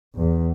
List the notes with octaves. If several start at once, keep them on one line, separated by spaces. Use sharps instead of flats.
E2